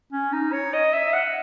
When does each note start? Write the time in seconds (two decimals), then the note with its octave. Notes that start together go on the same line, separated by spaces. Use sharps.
0.13 C#4
0.33 D#4
0.52 C#5
0.73 D#5
0.93 E5
1.13 F#5